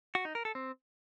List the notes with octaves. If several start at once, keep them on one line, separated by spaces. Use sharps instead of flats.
F#4
D#4
A#4
A4
C4